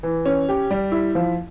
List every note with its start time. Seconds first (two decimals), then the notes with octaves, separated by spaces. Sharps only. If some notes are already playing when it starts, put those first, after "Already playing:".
0.03 E3
0.26 C#4
0.49 G4
0.71 G3
0.92 E4
1.15 F3